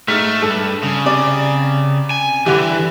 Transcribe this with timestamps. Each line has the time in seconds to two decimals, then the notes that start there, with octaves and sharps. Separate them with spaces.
0.08 G#2 A3 F6 B6
0.42 G2 A4
0.83 C#3
1.05 C3 D5
2.11 G#5
2.46 G2 D3 E3 G4